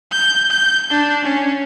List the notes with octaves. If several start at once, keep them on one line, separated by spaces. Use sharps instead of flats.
G6
G6
D4
C#4